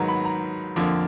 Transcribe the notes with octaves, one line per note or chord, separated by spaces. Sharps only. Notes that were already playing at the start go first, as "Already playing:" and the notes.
Already playing: G#2 D#3 F#3 B3 A#5
B5
A#5
F2 D3 F3 A#3